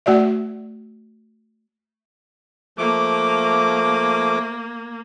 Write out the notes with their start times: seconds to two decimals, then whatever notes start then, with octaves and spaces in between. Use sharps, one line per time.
0.06 A3 F#4 D5 E5
2.78 F3 A3 A#3 D6